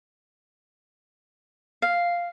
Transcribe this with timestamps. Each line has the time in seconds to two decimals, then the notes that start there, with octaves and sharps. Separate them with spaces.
1.82 F5